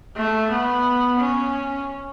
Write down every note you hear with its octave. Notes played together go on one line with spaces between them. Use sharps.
A3
B3
C#4